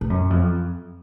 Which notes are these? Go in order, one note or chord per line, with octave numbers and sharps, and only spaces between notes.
A2
F#2
F2